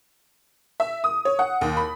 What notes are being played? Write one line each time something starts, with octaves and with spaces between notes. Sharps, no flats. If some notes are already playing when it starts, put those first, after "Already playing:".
E5
D#6
C#5
F#5
D#2
B5